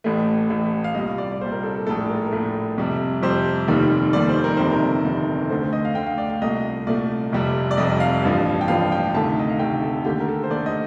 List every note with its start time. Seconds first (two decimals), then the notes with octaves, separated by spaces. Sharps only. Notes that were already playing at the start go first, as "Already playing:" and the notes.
0.04 A1 A2 A3
0.50 A1 A2 A3
0.84 F5
0.95 C2 A#2 G3 D#5
1.18 D5
1.32 D5
1.41 C2 A#2 G3 C5
1.52 A#4
1.63 A4
1.75 A4
1.86 A#1 A2 A3 A4
2.09 A#4
2.18 A4
2.26 A#4
2.32 A#1 A2 A3
2.78 F2 C3 G3
3.22 F2 C3 G3 C5
3.68 F1 D#2 D#3 G3
4.13 F1 D#2 D#3 G3 D5
4.29 C5
4.44 A#4
4.57 G1 F2 C3 D#3 C5
4.70 A#4
5.04 G1 F2 C3 D#3
5.50 D2 D3 A3 C5
5.61 C5
5.73 D#5
5.85 F5
5.95 D2 D3 A3 G5
6.06 F5
6.18 D5
6.30 F5
6.41 C2 A#2 A3 D#5
6.87 C2 A#2 A3 D5
7.32 F1 F2 C3 G3
7.71 D5
7.77 F1 F2 C3 G3 D#5
8.00 F5
8.23 A1 G2 F3
8.61 G5
8.68 A1 G2 F3 F5
8.92 G5
9.14 D2 C3 D#3 A3 A5
9.39 D#5
9.49 F5
9.59 D2 C3 D#3 A3 G5
9.83 A4
10.05 D#2 D3 A3 G4
10.20 A#4
10.28 A4
10.43 C5
10.50 D#2 D3 A3 D5
10.66 D#5